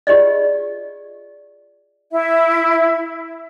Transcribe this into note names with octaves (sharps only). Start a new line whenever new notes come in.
F4 G4 G#4 D5 D#5
E4 E5